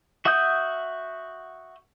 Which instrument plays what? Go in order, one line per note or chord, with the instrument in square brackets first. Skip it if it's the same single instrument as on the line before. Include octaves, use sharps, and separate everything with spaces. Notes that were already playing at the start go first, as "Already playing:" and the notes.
[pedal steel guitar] F#4 E5 F#5 D#6 G6